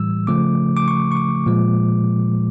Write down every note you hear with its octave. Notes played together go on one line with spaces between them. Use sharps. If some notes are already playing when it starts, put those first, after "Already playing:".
Already playing: A2 E3 G3 E6
C#3 F3 A3 D6
D6
C#6
C#6
D6
A#2 F3 G#3